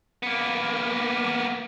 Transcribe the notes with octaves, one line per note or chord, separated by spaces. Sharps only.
A#3 B3